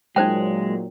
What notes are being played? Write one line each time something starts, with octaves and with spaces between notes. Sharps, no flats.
A#2 F#3 G#3 D#4 C5 G5